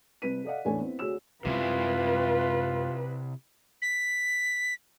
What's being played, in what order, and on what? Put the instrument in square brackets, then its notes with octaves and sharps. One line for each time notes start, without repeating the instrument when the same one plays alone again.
[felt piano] C2 C3 B4 B6 D#7
A4 D5 D#5 F5 F#5
A1 E2 A3 D4 C#5 G#5
B3 C4 E4
D2 F#4 G#4 C#5 E6 E7
[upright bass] F#2 G#3 [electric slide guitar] C3 E4 [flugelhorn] F4 [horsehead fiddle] B4
[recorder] B6